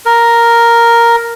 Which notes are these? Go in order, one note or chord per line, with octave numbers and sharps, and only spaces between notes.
A#4